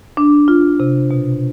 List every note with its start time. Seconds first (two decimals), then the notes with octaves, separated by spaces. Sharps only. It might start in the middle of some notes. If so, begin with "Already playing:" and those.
0.17 D4
0.48 F4
0.80 C3
1.11 B2